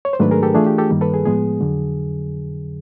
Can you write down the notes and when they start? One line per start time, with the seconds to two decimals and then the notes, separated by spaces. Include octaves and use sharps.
0.05 C#5
0.13 C5
0.19 G#2 D#3 F#3 A3 D4 B4
0.31 G#4 A#4
0.43 G4 A4
0.54 E3 A3 D4 F4 G#4
0.67 G4
0.78 G4 A4
0.90 G2 D#3 G3 A#3
1.01 A4 B4
1.14 G#4
1.25 A2 F3 G#3 B3 G#4
1.60 F2 D3 F#3